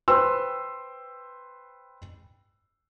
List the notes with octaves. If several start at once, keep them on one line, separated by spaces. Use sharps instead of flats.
B4 C5 G5 C6 E6